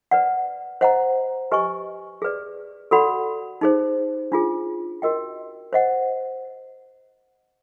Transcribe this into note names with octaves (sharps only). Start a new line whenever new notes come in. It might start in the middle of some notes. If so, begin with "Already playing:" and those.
B4 D5 F#5
C5 D#5 F#5 A#5
G4 B4 D#5 G#5 C#6
G#4 B4 D5
F#4 A4 D5 F#5 B5
D#4 G#4 C5
D4 F4 G#4
F#4 A#4 D#5 G5
C5 D#5 F#5